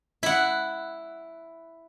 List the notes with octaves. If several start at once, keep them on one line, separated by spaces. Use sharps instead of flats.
E4 F#5